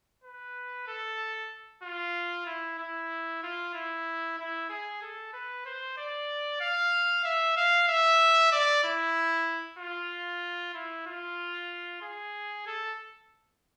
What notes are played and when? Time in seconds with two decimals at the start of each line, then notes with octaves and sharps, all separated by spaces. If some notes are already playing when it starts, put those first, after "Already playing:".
0.24 B4
0.88 A4
1.83 F4
2.46 E4
2.79 E4
3.43 F4
3.74 E4
4.38 E4
4.70 G#4
5.02 A4
5.33 B4
5.66 C5
5.97 D5
6.61 F5
7.24 E5
7.57 F5
7.88 E5
8.52 D5
8.84 E4
9.79 F4
10.74 E4
11.06 F4
12.02 G#4
12.67 A4